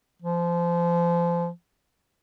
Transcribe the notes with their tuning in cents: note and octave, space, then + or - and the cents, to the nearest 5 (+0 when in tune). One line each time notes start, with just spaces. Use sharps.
F3 -25